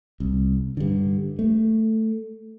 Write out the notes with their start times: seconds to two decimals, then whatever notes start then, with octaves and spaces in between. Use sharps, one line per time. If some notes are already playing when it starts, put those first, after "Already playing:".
0.20 C2
0.77 G2 D3
1.39 A3